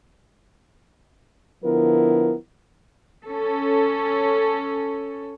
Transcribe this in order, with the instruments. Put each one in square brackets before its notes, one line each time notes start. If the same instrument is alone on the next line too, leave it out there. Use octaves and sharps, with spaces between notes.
[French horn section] D3 F3 B3 E4 A#4
[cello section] C#4 A4